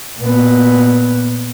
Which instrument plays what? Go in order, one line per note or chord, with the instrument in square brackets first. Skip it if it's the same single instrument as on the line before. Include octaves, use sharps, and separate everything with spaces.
[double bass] A#2 B3